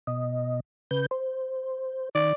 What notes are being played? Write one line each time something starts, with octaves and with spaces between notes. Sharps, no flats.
B2 D#5
C#3 B4 G6
C5
D#3 D5